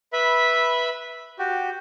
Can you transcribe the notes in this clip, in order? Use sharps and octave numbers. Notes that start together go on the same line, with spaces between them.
B4 E5 B5
F#4 G4